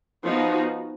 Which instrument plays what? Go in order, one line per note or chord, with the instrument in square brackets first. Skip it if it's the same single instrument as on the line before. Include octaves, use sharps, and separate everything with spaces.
[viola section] F3 B3 D#4 F#4